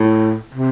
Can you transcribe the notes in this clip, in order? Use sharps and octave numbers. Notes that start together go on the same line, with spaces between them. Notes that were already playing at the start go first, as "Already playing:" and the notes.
Already playing: A2
C3